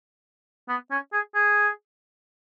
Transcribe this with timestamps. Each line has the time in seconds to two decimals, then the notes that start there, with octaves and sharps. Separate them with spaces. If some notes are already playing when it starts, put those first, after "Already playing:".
0.68 B3
0.91 C#4
1.13 G#4
1.35 G#4